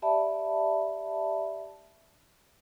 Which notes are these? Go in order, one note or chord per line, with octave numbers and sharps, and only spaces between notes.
G4 D5 E5 A5 B5